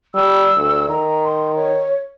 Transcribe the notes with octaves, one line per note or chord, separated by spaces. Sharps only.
G3 E6
D2
D#3 A#5
C6
C#5